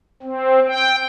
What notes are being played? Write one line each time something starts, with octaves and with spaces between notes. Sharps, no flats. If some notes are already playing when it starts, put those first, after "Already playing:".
C4
G5